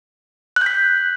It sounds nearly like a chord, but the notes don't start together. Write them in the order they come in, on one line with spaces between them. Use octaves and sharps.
F#6 G6 B6